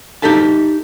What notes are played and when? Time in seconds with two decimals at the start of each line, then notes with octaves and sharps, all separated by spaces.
0.22 D#4 G4 A4 E5 A5